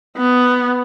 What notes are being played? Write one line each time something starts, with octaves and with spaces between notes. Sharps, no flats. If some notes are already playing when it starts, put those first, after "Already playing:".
B3